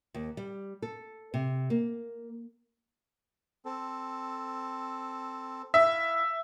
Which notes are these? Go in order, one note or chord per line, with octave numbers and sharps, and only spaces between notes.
D#2
G3
A4
C3
A#3
C4 A4
E4 E5 F5